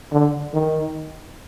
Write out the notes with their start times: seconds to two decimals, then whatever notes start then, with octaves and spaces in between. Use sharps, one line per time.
0.12 D3
0.54 D#3